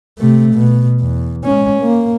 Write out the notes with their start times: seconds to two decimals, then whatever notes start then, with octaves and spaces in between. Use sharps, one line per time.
0.19 C3 A3
0.54 B2
1.00 E2
1.44 G#3 C#4
1.80 A#3